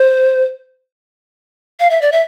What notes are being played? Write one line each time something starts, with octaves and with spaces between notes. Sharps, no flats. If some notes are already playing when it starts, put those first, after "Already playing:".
Already playing: C5
F5
E5
D5
E5